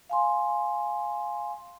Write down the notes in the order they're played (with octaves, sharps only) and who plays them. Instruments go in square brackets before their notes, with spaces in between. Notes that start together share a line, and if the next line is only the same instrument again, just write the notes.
[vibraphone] F5 G#5 C6